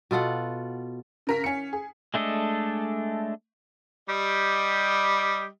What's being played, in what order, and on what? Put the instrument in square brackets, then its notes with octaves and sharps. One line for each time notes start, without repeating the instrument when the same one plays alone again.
[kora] B2 F4 A4 F#5
[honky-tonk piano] C#3 A#4 B6
C#4 C#7
G#4
[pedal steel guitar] G#3 A3 D4 A4 D#5
[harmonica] G3 G4 D#5